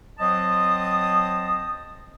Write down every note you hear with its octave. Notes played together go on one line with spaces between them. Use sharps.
F#3 C4 C5 D#5 A5 D#6